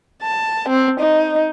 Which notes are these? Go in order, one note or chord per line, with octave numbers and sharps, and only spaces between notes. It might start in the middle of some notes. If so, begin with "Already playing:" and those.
A5
C4
D#4